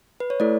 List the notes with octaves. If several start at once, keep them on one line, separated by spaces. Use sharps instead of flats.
B4
C#5
A3 E4 A4 D5